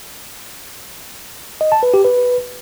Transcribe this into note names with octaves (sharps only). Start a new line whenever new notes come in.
D#5
A5
B4
G4
B4